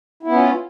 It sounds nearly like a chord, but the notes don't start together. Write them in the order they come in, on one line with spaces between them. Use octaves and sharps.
E4 B3 C#4 F4